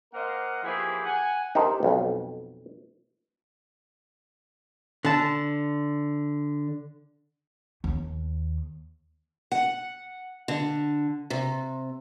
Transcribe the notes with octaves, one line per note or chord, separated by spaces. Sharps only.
A#3 A#4 C5 D#5 F5 F#5
E3 F3 A#3 E4 G4 G#4
F#5 G#5
D#4 G4 A4 A#4 C5
B1 F2
D3 A5
D#2
F#5
D3
C3